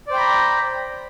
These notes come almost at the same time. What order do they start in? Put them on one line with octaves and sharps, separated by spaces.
D5 C5 G5 B5 A#5